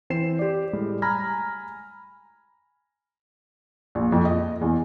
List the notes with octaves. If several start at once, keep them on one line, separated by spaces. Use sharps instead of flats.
E3 C4 C5 C7 E7
G4 D5
A2 G3 G#3
G#5 A#5 B5 F6 G#6 A#6
A#1
F2
D#5
E2